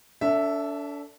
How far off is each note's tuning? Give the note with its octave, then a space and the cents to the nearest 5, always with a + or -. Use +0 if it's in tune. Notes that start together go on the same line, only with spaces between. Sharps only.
D4 -35 A4 +15 E5 +0